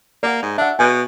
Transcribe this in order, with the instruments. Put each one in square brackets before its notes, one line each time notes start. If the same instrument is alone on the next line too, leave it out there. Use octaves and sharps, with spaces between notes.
[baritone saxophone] A#3 [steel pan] D5 F#5
[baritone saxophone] G#2
[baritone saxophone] D4 [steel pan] E5 F#5
[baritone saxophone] B2 [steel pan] G#5